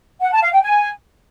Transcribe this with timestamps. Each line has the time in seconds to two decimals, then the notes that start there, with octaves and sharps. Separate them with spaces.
0.21 F#5
0.31 A5
0.41 F5
0.51 G5
0.62 G#5